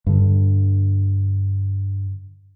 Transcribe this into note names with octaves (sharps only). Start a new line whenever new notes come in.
G2 D3